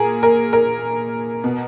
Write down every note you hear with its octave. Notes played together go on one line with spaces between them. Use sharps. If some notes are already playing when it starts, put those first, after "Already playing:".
Already playing: A#2 G#4 A#4
A#4
A#4
B2